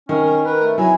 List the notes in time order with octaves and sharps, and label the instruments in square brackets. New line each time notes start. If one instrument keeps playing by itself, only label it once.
[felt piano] D#3 [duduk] C#4 [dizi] A#4
[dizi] A#4 [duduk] B4
[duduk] A3
[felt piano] F#3 [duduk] E4 [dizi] G#5